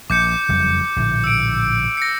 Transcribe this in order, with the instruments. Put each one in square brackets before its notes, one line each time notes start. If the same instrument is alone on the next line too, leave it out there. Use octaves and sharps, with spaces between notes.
[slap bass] A#1 [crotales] D6 G6 C#7
[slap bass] F#1 F2 G3
A#1 A2 D3
[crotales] E6 D7
A#6 C#7